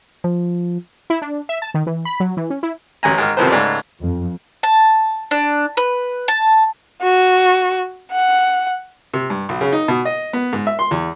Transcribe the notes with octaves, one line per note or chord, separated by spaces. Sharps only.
F3
E4
D4
E5
A5
D#3
E3
B5
F#3
E3
C#4
E4
A1 F#2 G#5 A#5
G#2 D#3 A#4 F6
B1 C3 D#3 F3 B4 C5
C#2 G#2 A3 D5
F2
A5
D4
B4
A5
F#4
F#5
C3
G2
B1
C#3
D#4
B2
D#5
B3
G#2
E5
C6
E2